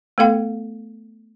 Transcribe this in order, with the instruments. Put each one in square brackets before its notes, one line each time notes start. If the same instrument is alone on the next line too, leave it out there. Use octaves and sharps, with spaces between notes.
[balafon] A3 B3 A4 F5 G5